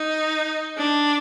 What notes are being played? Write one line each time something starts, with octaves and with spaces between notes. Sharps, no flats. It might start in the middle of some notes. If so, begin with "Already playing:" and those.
Already playing: D#4
D4